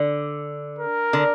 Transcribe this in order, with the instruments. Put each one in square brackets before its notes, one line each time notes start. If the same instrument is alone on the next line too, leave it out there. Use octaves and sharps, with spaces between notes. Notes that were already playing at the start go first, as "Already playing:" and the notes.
Already playing: [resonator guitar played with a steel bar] D3
[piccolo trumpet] A#4
[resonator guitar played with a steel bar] D3